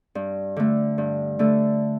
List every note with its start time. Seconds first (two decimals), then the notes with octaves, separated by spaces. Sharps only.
0.15 G2
0.57 D3 A3
0.98 G2
1.39 D3 A3